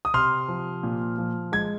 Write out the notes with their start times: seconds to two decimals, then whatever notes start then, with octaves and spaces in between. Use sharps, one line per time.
0.05 D#6
0.14 C3 C6 F6
0.48 F3
0.83 A#2
1.18 F3
1.52 G#3 G#6